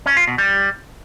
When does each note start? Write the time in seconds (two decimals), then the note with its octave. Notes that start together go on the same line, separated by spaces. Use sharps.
0.06 C#4
0.17 F4
0.27 B2
0.38 G3